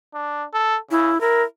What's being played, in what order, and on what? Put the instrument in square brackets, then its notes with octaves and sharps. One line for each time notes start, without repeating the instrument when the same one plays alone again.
[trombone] D4
A4
[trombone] C#3 [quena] E4
[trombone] E4 [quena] A#4